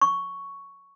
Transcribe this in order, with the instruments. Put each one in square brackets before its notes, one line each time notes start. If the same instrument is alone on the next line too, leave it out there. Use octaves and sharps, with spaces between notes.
[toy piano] C#6